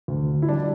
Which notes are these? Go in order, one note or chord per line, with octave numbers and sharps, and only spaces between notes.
D2
D3
E4
G3 D4